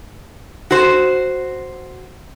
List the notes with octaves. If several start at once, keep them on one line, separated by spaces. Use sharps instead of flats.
F#4 C5